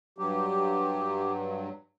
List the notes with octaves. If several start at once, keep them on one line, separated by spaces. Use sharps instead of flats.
G2 F#3 G4